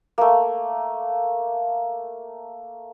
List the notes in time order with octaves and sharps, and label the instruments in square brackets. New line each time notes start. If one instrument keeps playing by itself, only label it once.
[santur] A3 A#3